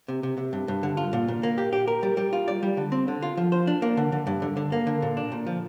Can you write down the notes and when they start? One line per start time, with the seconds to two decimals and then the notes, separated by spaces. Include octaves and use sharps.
0.08 C3
0.23 C3
0.38 C3
0.53 G2
0.68 G2
0.83 D3
0.97 F4
1.13 A#2
1.28 A#2
1.43 A#3
1.58 G4
1.73 G4
1.88 A#4
2.03 G3
2.17 G3
2.33 F4
2.48 D5
2.63 G3
2.77 D3
2.92 C4
3.08 D3
3.22 F4
3.37 F3
3.52 C5
3.67 D4
3.82 A#3
3.97 D3
4.12 D3
4.27 G2
4.42 D3
4.57 D3
4.72 A#3
4.87 D3
5.02 A#2
5.17 D4
5.32 A#2
5.47 F3